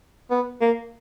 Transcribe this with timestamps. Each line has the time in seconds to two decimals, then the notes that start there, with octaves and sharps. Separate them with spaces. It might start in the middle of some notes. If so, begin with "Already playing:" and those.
0.31 B3
0.61 A#3